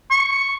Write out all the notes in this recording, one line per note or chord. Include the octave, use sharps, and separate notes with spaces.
C#6